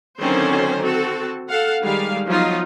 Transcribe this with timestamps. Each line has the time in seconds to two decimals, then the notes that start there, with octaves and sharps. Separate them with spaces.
0.20 D3 D#3 F#3 C4 C#4 C5
0.82 C4 F#4 A4
1.48 A4 F5 F#5
1.82 D#3 G3 G#3 F5
2.26 F3 F#3 B3 D#4 F4